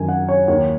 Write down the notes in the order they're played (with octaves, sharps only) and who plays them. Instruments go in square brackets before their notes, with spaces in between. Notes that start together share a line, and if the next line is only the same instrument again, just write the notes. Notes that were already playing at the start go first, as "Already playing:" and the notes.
Already playing: [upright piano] F#2 D#3 G#5
F#5
C#5
D#2 D#3 C#5